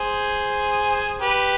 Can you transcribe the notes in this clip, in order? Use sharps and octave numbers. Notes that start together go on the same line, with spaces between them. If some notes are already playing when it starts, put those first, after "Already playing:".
Already playing: G#4 C5
G4 B4